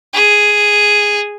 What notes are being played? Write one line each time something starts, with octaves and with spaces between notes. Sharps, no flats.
G#4